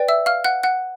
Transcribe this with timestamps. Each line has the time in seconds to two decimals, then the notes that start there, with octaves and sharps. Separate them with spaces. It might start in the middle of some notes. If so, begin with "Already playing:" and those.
Already playing: B4 D5 G5
0.08 E5 E6
0.26 F5 F6
0.44 F#5 F#6
0.63 F#5 F#6